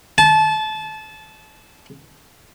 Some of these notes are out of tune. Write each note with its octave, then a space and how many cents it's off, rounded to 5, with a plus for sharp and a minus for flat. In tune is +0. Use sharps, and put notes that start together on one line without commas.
A5 -25